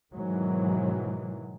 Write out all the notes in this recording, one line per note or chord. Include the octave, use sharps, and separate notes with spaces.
G#2 B2 D#3 E3 F#3